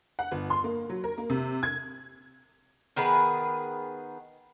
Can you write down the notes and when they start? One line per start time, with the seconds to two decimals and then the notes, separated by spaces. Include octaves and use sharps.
0.19 F#5
0.31 G1
0.50 C6
0.64 A#3
0.90 F#3
1.04 A#4
1.18 A#3
1.30 C3
1.63 G#6
2.96 D#3 B3 G#4 B4